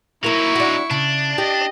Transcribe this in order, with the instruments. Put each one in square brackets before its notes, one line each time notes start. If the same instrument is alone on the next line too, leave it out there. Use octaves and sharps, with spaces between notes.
[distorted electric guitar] F#3 D#4 [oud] A#3 A#4 [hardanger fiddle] E4 C#6
[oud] D4 F#4
[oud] C#3 [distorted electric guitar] D4
[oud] G4 [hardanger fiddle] D#5